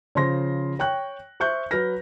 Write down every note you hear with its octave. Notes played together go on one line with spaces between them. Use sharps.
C#3 F3 C5 C6 A#6
C#5 G5 C#6 F#6
C5 E5 C#6 F#6 G6
F#3 B4 F6 A#6